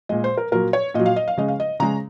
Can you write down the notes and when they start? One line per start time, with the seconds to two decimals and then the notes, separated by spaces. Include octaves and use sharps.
0.09 A#2 G#3 D#5
0.24 C5
0.37 A#4
0.52 A#2 F#3 A#4
0.73 C#5
0.94 A#2 F#3 D#5
1.06 F5
1.16 D#5
1.28 F5
1.37 C#3 G#3 D#5
1.48 F5
1.60 D#5
1.80 C#3 G#3 A#5